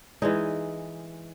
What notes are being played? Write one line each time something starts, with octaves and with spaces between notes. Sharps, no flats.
E3 G#3 D#4